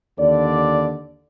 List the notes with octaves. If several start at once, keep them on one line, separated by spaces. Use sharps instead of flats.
D#2 D3 D5